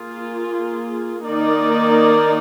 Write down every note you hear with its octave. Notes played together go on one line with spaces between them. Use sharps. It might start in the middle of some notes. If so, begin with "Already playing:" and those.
Already playing: A#3 F4 G#4
D#3 A#3 D#4 A#4 D5